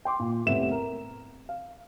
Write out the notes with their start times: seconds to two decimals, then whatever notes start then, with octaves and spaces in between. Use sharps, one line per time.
0.05 G5 C6 D6
0.19 A#2
0.46 F1 A2 C3 B3 E5 E7
0.71 A#4
1.49 F5